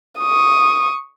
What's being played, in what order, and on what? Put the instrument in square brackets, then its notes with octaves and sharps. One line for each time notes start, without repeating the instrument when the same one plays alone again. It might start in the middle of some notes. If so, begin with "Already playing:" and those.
[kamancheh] C#6 D#6